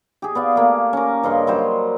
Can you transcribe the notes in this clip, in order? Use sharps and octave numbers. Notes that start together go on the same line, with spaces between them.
G4 G#4
B3 D5 F5
A3 A#3
C#4 A#4
G2 C#3 D#5 C6
F#3 G3 C5